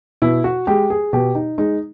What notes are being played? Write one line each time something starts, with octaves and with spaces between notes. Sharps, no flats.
B2 E4
F#4
G#3 G4
G#4
B2 G4
D#4
G#3 D#4